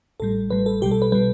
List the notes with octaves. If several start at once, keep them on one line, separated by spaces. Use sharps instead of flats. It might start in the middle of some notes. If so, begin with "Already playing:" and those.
A1 A2 G3 A4
A1 A2 G3 B4
A4
B1 B2 G3 G4
A4
B4
B2 G3 B4